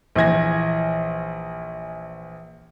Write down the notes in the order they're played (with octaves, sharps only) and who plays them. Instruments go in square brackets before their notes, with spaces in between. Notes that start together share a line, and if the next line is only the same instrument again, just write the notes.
[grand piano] A#1 E3 G#6 A#6